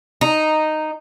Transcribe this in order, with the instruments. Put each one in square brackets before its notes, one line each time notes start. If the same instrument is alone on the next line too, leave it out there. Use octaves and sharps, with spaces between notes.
[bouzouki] D#4